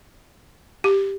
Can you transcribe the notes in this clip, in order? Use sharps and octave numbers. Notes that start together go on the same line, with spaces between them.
G4